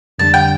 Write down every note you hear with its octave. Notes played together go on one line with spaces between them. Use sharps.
F2 D3 G3 D4 A5
G5